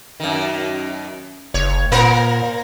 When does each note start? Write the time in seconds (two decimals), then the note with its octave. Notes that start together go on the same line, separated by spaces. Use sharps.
0.20 F#2 D#3
1.54 F#1 C#5
1.92 A#2 A#3 A#4 C5